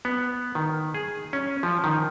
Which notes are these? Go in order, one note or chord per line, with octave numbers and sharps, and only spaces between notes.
B3
D#3
G#4
C#4
F3
D#3